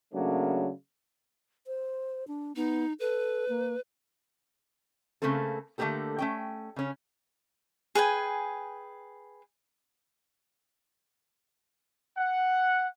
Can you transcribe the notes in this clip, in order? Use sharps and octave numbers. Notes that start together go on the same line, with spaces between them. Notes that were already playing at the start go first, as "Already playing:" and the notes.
C#3 F#3 A3 A#3 D4
C5
D4
B3 D#4
A4 B4
A#3
C#3 E3 A3 A#3 C4 A4
D3 A3 A#3 C4 G4 A4
A3 C#4 G5
C#3 C#4
G#4 B4 G5 G#5
F#5